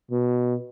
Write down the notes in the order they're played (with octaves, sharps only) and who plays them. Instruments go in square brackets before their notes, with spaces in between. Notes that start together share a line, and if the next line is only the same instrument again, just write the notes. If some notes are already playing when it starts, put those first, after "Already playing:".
[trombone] B2